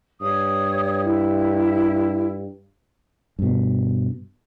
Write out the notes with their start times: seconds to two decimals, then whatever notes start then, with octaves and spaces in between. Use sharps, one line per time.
0.21 G2 C#5 D#6
1.05 E4
3.39 G2 B2